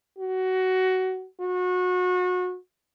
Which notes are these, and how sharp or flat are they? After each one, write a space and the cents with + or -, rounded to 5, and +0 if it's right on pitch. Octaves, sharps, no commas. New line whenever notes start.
F#4 +15
F#4 -30